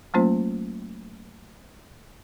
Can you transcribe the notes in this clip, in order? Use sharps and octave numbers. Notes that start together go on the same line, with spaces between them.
F#3 A3 A#3 C#4 F4 C5